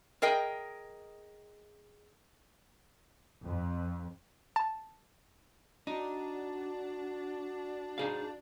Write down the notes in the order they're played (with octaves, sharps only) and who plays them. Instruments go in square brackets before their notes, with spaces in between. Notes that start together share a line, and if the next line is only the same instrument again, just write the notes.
[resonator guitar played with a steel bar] G#4 A#4 D#5 G5
[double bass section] F2
[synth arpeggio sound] A5
[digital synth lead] D4 [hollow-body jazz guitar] D#4 [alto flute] F#4
[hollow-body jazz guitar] D#4 G#4 F5